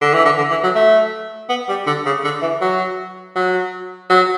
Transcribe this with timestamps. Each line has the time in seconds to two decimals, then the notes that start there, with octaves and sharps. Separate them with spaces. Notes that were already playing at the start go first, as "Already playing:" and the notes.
0.02 D3
0.14 E3
0.25 D3
0.38 D3
0.51 E3
0.63 F#3
0.75 A3
1.49 B3
1.69 G3
1.87 D3
2.06 C#3
2.24 D3
2.42 E3
2.61 F#3
3.35 F#3
4.10 F#3